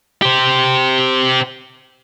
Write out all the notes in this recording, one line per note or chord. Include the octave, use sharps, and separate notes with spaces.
G4 C5